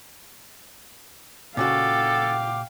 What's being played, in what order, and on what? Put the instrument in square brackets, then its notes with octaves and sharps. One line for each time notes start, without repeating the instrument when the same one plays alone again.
[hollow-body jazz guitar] A#2 C#3 F#4 [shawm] A4 [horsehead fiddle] F5 G5 [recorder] D6